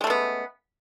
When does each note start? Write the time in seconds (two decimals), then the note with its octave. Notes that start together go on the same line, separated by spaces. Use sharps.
0.01 G#3
0.04 A3
0.07 C#3
0.10 B3